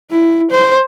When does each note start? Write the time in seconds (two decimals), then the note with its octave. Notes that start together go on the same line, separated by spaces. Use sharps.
0.10 E4
0.51 C5